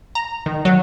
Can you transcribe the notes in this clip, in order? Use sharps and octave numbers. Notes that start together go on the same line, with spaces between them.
A#5
D#3
F#3